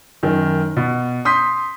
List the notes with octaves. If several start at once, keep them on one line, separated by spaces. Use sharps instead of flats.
F#2 D#3
B2
C6 D#6 G6 B6